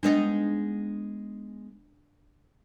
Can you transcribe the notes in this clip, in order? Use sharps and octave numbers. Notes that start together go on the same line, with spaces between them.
G#3 B3 D4 D#4 B4 D#5